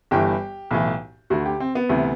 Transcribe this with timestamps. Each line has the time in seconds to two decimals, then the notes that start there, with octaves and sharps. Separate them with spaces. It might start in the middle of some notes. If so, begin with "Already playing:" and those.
0.11 G1 G2 E3 G4
0.71 B1 A2 E3
1.30 D2 D3 F#4
1.46 G4
1.60 C4
1.75 B3
1.89 D2 C3 E3